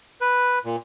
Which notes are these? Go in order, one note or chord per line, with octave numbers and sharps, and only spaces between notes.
B4
A#2